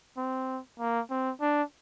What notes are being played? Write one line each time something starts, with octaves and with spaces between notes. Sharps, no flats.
C4
A#3
C4
D4